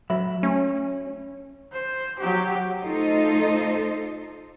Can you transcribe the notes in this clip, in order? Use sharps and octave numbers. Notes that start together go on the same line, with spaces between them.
F#3 E5 B5
A3 C#4
C5
F#3 G4
A3 D#4 F4 A4 C5 D#5